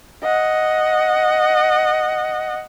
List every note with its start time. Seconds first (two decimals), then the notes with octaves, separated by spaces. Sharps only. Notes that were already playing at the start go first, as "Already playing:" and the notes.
0.23 D#5 F#5